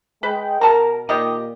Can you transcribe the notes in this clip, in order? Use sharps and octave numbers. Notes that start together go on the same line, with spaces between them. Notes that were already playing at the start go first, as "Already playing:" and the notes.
G#3 B4 G5
B2 A#4 A5 A#5
A#2 D#3 G4 D#5